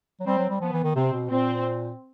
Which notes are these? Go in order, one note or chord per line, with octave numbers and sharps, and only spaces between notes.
F#3
G3 C4
F#3
G3
F3 B3
E3
D#3
C3 C4
B2
A#2 C4